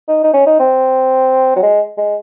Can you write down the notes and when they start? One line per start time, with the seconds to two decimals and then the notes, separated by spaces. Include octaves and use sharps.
0.08 D#4
0.24 D#4
0.34 C#4
0.47 D#4
0.60 C4
1.56 F#3
1.63 G#3
1.98 G#3